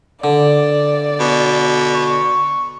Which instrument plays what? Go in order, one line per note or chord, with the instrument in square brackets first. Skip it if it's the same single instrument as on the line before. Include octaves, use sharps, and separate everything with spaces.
[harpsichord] D3 [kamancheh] D5
[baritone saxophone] B2
[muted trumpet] C#6